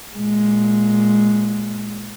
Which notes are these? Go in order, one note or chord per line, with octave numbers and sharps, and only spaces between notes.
A#2 G#3